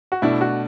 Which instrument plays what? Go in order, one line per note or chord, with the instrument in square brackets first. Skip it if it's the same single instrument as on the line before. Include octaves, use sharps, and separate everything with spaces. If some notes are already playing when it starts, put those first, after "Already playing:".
[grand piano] F#4
[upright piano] B2 A3 D4 [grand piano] E4
[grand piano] F#4